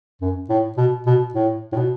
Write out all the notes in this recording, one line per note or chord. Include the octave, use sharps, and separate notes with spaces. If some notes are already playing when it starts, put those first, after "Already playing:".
F#2
A2
B2
B2
A2
A2
B2